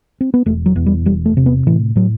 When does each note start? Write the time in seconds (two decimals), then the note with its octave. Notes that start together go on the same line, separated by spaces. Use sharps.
0.21 C4
0.34 B3
0.46 E1 A3
0.66 F#3
0.76 E2
0.86 G3
1.06 E1 G3
1.26 A3
1.37 C3
1.46 B3
1.67 A2 E3
1.96 A2 F#3